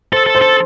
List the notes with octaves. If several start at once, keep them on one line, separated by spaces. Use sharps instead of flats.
A4 C5
A4
C5
A4